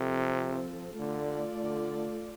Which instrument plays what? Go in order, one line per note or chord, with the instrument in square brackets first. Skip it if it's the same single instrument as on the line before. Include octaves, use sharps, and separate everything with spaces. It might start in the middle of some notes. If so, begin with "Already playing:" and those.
Already playing: [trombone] C3 [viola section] F3 C4 A4
[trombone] D3 [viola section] A3 F4 A4 D5
[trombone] D3